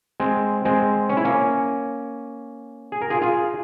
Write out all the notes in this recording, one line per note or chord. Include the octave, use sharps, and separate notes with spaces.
G#3 C4
G#3 C4
C#4
E4
A#3 C#4
G#4
A#4
F4 G#4
F4 G#4